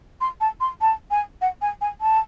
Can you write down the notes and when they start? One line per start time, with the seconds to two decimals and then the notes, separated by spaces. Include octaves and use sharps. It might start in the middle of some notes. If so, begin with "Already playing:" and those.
0.21 C6
0.40 A5
0.60 C6
0.81 A5
1.11 G#5
1.41 F#5
1.62 G#5
1.81 G#5
2.01 A5